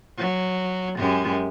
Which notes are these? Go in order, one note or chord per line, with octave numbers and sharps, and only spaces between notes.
F#3
F#2 G#3 G4